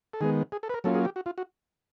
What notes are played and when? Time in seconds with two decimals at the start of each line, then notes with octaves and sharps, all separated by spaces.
0.13 A4
0.21 D#3 G#3 B3 G#4
0.52 G#4
0.63 A4
0.69 B4
0.74 A#4
0.84 F#3 A#3 C#4 F4 A4
0.95 G#4
1.05 G4
1.16 F#4
1.26 F4
1.38 F#4